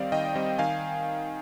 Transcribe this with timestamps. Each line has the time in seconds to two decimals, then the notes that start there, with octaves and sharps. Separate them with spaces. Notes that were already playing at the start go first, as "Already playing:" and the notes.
Already playing: D#3 G3 C4 D5 F5
0.12 D#3 D#5 G5
0.36 G3 C4
0.58 D#3 F5 G#5